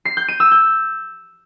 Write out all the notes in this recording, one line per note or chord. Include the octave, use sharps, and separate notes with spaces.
C7
G6
D#7
E6
G6